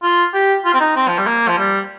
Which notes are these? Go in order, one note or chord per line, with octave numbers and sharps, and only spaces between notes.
F4
G4
F4
C4
D#4
C4
F3
G3
A#3
F3
G3